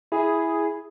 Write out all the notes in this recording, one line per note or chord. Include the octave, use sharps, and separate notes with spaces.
E4 G#4